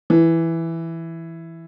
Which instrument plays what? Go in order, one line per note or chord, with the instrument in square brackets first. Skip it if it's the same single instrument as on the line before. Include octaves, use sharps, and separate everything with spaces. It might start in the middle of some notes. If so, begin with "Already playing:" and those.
[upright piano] E3